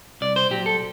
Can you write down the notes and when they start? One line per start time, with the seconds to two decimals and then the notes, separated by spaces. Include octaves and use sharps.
0.21 C2 D5
0.36 C5
0.50 A#2 F#3 G4
0.66 A4